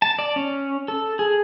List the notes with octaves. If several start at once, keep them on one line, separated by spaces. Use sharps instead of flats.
A5
D5
C#4
A4
G#4